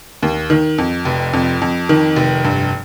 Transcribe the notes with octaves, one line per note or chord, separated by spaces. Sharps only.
D#2
D#3
F2
F1
F2
F2
D#3
F1
G2